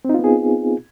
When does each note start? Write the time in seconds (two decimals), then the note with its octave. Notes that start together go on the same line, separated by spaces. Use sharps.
0.05 C4
0.09 D#4
0.14 F4
0.19 B3
0.24 G#4